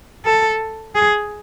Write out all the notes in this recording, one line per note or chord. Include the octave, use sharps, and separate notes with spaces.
A4
G#4